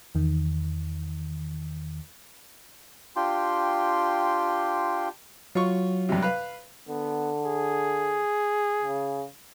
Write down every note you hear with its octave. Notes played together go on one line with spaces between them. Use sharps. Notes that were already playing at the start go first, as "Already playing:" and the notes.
E2 D#3
D4 F4 G4 G5 C6
F#3 F4 C#6
G2 C3
B4 F5
D3 B3
G#4
C#3